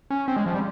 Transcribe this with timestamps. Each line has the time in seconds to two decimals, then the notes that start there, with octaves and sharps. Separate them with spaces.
0.10 C#4
0.28 C4
0.36 G#3
0.46 F3
0.54 G3